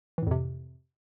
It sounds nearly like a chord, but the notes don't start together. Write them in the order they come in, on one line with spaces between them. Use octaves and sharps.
E3 A2 F2 C3